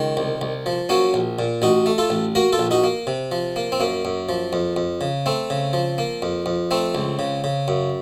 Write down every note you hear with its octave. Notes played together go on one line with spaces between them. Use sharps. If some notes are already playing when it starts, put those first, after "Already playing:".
Already playing: C#2 D#3
C2
C2
F3
F#3 A#3 C#4
A#1
A#2
A1 D#4 F#4
A3
F4 A4
A1
A#3 F#4 A#4
F4 A4
A#1
D#4 F#4
A#3
C3
F3
A#3
C4
F#2 A#3
F#2
F3
F2
F2
C#3
A3 C4
C#3
F3
A#3
F2
F2
A3 C4
C#2
C#3
C#3
F#2